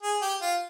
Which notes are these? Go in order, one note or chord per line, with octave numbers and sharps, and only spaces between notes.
G#4
G4
F4